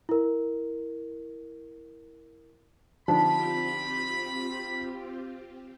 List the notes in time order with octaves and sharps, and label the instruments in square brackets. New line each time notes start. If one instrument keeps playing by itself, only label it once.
[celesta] E4 A#4
[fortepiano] D3 F3 D4 [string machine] C4 F4 G4 [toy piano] D#4 [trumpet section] B5